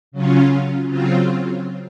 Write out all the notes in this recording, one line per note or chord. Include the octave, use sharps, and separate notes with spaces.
C#3 F#3 C#4 F4
C#3 F#3 C4 F4